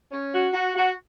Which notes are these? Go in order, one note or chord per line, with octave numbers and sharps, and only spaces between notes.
C#4
F#4
F#4
F#4